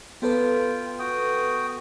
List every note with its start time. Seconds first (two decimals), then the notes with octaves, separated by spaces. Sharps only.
0.22 B3 F4 A4 B4 G5
0.99 F#4 G5 D#6